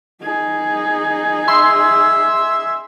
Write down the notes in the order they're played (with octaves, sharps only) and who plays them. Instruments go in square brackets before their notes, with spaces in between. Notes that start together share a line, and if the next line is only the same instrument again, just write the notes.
[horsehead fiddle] D#4 G#4
[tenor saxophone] E5 [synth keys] C6